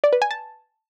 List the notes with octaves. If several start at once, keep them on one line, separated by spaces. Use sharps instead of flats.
D5
B4
G#5
A5